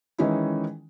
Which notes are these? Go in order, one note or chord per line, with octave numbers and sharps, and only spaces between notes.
D#3 E3 G#3 C#4 D#4 E4